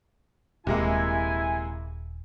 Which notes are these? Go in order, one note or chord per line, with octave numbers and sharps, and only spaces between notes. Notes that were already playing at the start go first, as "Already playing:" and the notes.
D#1 C3 G#3 A#3 E4 G#5